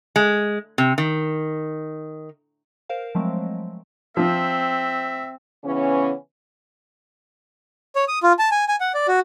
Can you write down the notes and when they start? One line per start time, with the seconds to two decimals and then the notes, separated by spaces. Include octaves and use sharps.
0.16 G#3
0.78 C3
0.98 D#3
2.89 A#4 C5 F5
3.15 F3 F#3 G#3 A3 C4
4.17 F3 C4 E5
5.64 C#3 E3 B3 C#4
7.96 C#5
8.08 D#6
8.23 F4
8.39 A5
8.51 G#5
8.68 G#5
8.80 F#5
8.94 D5
9.08 F#4